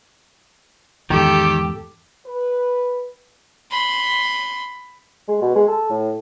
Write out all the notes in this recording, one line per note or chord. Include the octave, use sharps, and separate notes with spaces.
E2 G#2 D#3 G4 A4 G5
B4
B5 C6
G#3
B2
G#3
A4
A2